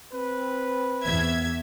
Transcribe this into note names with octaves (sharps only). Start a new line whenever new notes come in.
C4 B4
E2 E5 G#6